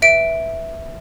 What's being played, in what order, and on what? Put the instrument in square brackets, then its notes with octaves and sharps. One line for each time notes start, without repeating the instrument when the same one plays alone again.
[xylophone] B4 E5 D7